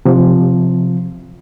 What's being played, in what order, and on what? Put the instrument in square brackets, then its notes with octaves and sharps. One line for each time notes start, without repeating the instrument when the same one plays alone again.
[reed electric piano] C3 F3